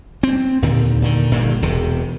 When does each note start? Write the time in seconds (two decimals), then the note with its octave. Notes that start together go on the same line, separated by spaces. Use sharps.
0.23 C4
0.62 D#2 A#2 D3 D#3
1.02 A#2 D3 D#3
1.31 G1 A#2 D3 D#3
1.63 E1 E2 C3